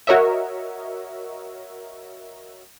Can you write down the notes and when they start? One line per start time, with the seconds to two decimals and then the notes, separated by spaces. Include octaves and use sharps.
0.07 F#4 A#4 C#5 D#5 E5